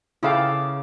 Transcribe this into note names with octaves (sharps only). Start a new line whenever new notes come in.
C#3 E4 A4 F5 G5 D6